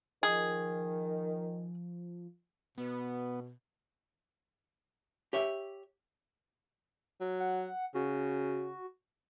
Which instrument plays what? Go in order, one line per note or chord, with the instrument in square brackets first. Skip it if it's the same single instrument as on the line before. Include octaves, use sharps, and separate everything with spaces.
[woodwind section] D#3 [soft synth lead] F3 [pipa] G#4
[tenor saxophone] B2 [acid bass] B3
[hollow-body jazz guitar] G4 C#5 E5
[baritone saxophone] F#3
[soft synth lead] F#5
[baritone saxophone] C#3 [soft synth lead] F#4